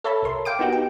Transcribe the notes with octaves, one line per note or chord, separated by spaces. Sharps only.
A4 C#5 E5 A5 B5
C2 A#4 C6
F5 G5 D6 D7
B3 D#4 F#4 G4
G5